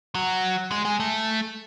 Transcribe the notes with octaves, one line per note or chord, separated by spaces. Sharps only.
F#3
G#3
G#3
A3